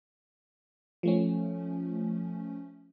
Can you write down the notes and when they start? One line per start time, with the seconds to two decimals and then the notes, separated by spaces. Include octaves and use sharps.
1.03 F3 A3 C#4